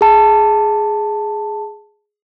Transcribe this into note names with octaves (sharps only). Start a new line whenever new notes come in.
G#4 A5